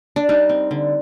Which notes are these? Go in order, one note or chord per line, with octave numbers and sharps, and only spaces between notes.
D4
G3 D#4
C4
D3